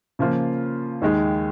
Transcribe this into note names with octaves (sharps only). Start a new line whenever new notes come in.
C#3 F3 A#3 F4
D#2 D#3 G#3